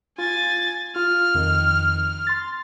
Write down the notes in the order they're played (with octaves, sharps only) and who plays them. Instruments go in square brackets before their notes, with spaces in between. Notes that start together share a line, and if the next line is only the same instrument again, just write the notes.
[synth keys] F4 [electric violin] G#5 A6
[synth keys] F4 [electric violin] F6
[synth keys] F2 D#3
C6 A6